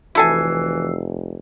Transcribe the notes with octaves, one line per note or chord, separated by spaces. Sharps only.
F1 E3 E4 F#4 A4 G#5 E6 C7